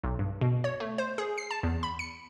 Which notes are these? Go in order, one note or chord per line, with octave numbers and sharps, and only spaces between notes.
B1
G2
B2
C#5
A3
C5
G#4
C7
A5
E2
B5
C#7